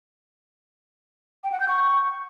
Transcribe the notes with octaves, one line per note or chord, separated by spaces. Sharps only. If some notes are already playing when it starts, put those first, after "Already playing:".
G5
F#5
G6
C#6